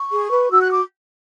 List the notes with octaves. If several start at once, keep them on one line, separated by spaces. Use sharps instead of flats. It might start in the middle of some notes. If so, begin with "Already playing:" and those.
Already playing: C#6
G#4
B4
F#4 E6
F#6
D6